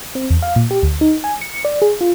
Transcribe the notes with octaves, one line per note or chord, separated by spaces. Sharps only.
C4
E2
F5
A#2
G4
D2
D#4
G#5
C#7
D5
G#4
F4